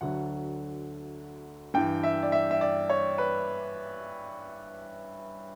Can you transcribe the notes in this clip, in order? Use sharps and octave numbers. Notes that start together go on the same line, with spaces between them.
D2 D3 F#3 F#5
G2 E3 G5
E5
D5
E5
E5
D5
C#5
B4